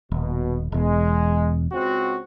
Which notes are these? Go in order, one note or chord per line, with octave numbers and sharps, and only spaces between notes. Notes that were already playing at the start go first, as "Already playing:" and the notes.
D#1 B2
E1 E2 G#3
C#2 C4 F#4